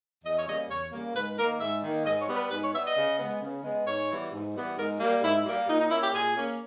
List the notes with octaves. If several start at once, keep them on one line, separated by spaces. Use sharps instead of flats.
E2 D#5
C#5
C#3 G3 A#3 D#5
E2 C#5
C#3 G3 A#3
G#2 B4
D#3 A#3 A#4
G#2 E5
D#3 A#3
G#2 D#5
C#5
G3 B3
B4
G#2 B4
C#5
G3 B3 E5
D#5
C#3
G#3 B3
C#3
G#3 B3
G#2 C#5
E3 G3 B3
G#2
E3 G3 B3
G#2 A#4
G3 A#3
G#2 E4
G3 A#3
A#2 D#4
D#4
A#3 C#4 E4
G4
A#2 G#4
A#3 C#4